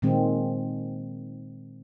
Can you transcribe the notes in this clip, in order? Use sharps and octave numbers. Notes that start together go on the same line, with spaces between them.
A#2 D#3 G#3 C4